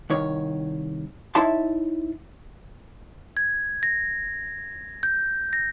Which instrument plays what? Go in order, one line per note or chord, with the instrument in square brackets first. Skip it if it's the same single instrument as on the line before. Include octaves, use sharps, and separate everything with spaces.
[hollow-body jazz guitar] C2 D#3 C#5
D#4 E4 C#5 E5 A5 C6
[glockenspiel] G#6
A#6
G6
A#6